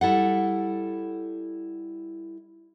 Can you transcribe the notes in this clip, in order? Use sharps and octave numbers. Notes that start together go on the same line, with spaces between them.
G3 E4 A4 F#5